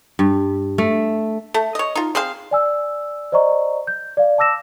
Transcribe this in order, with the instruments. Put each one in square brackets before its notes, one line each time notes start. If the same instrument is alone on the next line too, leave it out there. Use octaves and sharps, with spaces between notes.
[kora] G2
A3
[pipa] A3
C#5 D#5
D#4 F4
C4 G#4 C5 F5
[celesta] D5 G#5 E6
C5 D5 D#5 A#5 C#6
G6
D5 F5
A5 D6 E6 A#6 E7